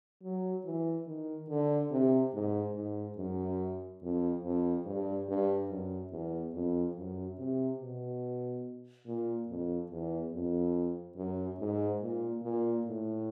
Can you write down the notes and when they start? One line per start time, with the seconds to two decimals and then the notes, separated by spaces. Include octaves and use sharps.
0.23 F#3
0.65 E3
1.07 D#3
1.49 D3
1.91 C3
2.33 G#2
2.75 G#2
3.18 F#2
4.02 F2
4.44 F2
4.86 G2
5.29 G2
5.70 F#2
6.12 E2
6.54 F2
6.96 F#2
7.38 C3
7.80 B2
9.07 A#2
9.48 F2
9.91 E2
10.33 F2
11.16 F#2
11.59 G#2
12.01 A#2
12.43 A#2
12.86 A2